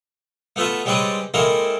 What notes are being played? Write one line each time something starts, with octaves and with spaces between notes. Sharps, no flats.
A3 B3 F4 B4 E5
G3 G#3 C4 C#4 B4 D5
G#3 A#3 C4 E4 A4 A#4